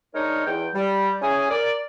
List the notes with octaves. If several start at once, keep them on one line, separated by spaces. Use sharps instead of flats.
G#3 D4 D#4 A#4 C#5
E2 G5
G3
C#4 E4 G#4 G#5
A#4 D5